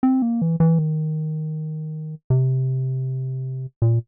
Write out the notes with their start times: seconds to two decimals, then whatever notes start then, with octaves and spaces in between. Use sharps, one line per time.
0.03 C4
0.22 A#3
0.42 E3
0.60 E3
0.79 D#3
2.30 C3
3.82 A#2